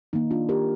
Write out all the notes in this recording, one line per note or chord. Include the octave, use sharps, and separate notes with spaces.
D#3 A#3 D#4
D4 F4
G4 A#4